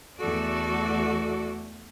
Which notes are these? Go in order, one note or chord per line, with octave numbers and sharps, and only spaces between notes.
E2 A3 F#4 A4 D5